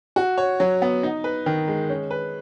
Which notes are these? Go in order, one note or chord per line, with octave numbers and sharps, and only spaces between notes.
F#4
C#5
F#3
B3
D#4
B4
D#3
G#3
C#4
B4